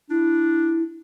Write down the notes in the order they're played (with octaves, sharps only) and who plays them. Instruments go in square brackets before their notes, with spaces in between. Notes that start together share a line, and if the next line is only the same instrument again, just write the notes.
[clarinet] D4 [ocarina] E4